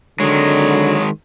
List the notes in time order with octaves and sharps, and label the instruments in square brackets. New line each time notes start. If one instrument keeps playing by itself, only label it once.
[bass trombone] D3 [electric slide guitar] D#3 G#3 [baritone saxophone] F#3